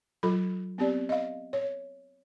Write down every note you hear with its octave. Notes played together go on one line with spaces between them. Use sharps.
F#3 F4 A4 B5
B3 C4 G4 D5
D#5 F5
C#5